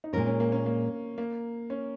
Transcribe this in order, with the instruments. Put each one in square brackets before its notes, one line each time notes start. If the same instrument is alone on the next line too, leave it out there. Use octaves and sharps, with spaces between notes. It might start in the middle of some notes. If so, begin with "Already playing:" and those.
[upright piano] D#4
[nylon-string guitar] A#2 G#3 F4 A#4 [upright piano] C#4
[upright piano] C#4
A#3
C#4
A#3
A#3
C#4